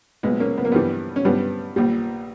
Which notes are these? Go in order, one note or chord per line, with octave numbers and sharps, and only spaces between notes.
B1 A#2 G#3 B3
A#3 C#4
B3
A#3
G2 E3 G3 B3
C#4
G2 G3 B3
A#1 A#2 G3